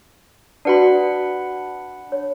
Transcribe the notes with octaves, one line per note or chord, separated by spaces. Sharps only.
D4 F#4 B4 D5 F#5 B5
C#5